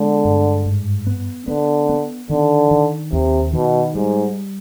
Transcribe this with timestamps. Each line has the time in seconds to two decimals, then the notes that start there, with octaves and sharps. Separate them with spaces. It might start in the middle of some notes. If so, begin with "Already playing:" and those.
Already playing: D3 G#3 B3
0.25 G2
0.66 G#2
1.07 B3
1.48 D3 B3
1.89 B3
2.30 D3 D#3
2.71 D#3
3.12 D#2 C3
3.53 B2 D#3
3.95 G#2 G3